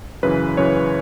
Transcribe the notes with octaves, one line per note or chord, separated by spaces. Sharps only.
F#2 C#3 E3 B4
F#2 C#3 E3 C#5